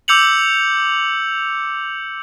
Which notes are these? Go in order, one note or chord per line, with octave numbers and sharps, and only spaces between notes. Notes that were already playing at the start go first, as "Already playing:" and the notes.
D6 E6 G6 C#7 F7 F#7